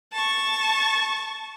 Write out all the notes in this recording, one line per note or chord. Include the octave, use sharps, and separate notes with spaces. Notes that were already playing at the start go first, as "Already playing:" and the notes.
A5 C#6